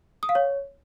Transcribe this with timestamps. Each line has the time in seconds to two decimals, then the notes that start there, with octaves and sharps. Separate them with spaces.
0.23 D#6
0.29 F5
0.35 C#5